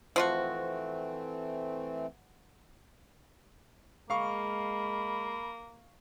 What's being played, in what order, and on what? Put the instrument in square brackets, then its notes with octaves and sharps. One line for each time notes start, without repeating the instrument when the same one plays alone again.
[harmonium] E3 A3 C4 [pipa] F3 F4 F#4
[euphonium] G#3 [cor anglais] A#3 [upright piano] F5 C#6 [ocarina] B5